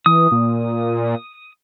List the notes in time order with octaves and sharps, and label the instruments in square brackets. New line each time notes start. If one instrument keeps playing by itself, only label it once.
[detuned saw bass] E3 [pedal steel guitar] D#6
[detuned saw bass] A#2